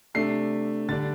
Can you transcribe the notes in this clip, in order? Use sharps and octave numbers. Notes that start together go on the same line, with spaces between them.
C3 A3 D4 C7
D3 G3 D4 A6